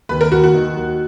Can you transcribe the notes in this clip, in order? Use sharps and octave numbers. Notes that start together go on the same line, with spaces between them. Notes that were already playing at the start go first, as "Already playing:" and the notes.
D#2 B4
A#4
D#2 F#4
F#4
D#3
D#2